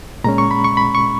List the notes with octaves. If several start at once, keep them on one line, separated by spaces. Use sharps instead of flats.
A#2 G#3 C#4 A#5
C#6
B5
C#6
B5
C#6